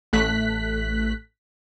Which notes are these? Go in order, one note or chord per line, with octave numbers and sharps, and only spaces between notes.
A1 A3 F#6 B6